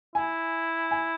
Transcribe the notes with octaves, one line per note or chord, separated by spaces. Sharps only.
E4 G#5
G#5